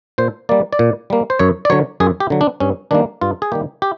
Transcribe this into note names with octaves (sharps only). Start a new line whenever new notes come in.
A#2 C5
G3 A#3 D5
D5
A#2
G3 A#3
C5
F#2 C#5
D5
D3 F#3 C#5
F#2 G#4
G4
D3 F#3
D4
G2 C#4
D#3 G3 A#3 D4
G2 F4
G#4
D#3 G3 A#3 G4
G4